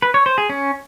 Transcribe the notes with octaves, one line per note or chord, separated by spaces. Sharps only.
B4
C#5
C5
G#4
C#4